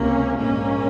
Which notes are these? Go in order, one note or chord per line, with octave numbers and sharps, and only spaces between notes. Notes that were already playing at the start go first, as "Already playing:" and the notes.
Already playing: C#2 C3 A#3 C#4
A#1 G#2 A#3 C#4